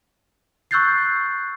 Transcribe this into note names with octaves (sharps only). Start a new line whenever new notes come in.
C#6 E6 F#6 G6 A6 C7